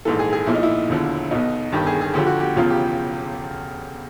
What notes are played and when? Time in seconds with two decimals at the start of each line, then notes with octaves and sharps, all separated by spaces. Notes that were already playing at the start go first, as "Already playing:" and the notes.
0.05 A#1 G#2 E3 A4
0.19 G#4
0.33 G#4
0.47 B1 A#2 F3 E4
0.55 D#4
0.63 E4
0.89 E1 D#2 D3 F3
1.31 B1 B2 D#4
1.72 G1 G2 D#3 G4
1.87 G#4
2.01 G#4
2.14 D2 D3 F3 G4
2.27 F#4
2.40 G4
2.56 E1 E2 C#3 F3 F4
2.70 G4